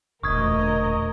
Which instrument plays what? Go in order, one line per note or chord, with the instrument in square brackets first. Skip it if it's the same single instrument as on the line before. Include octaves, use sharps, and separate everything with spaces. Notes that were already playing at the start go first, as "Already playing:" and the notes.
[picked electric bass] E1 [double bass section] D2 A#2 [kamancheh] A#4 D#5 [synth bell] C#6 D#6 G#6